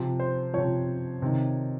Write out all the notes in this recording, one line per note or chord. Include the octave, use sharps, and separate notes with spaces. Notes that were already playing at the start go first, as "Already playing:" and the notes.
Already playing: C3 F3
C5
C3 F3 C#5
C3 D#3